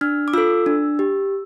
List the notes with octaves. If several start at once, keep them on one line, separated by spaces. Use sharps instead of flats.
D4 F6
D6
F4 A4 E6
D4
G4